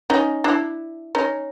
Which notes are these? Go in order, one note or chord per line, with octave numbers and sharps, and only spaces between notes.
C#4 D#4
D4 E4
C#4 D#4